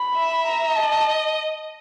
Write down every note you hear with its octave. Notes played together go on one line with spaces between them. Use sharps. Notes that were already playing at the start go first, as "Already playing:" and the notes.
Already playing: B5
E5
A#5
D#5 A5